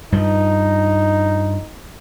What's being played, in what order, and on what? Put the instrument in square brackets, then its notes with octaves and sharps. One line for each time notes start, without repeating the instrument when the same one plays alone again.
[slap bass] G2 F3 [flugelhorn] D#4